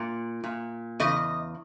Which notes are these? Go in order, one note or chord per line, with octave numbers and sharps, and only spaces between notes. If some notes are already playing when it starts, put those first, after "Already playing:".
Already playing: A#2
A#2
E2 C#3 D#5